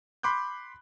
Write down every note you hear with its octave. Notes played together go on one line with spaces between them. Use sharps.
B5 C6 D6 F#6 G6